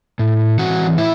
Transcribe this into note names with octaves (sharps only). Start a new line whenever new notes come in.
A2
E3 C4 F#4 F#5
A2 E4 E5